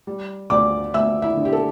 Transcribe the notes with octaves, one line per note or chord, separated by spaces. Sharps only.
G3
D2 D5 D6
D2 E5 E6
E4 E5
D3
G4
A4